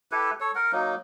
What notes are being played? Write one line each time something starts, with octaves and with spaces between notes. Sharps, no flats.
E4 G4 A4 B4
A4 C#5
A#4 F#5
F#3 A#3 D#4